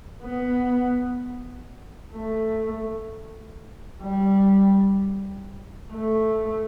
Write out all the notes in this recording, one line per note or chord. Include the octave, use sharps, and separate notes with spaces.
B3
A3
G3
A3